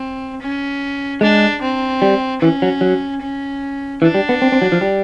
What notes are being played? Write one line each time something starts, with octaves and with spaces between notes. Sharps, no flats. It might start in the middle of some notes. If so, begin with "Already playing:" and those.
Already playing: C4
C#4
G#3 D4
C4
G3
E3 C#4
F#3
F#3
C#4
E3 D4
G3
B3
C4
C4
F#3
F3
G3